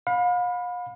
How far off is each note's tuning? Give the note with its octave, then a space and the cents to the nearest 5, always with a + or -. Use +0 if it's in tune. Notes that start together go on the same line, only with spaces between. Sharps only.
F5 +40 B5 +0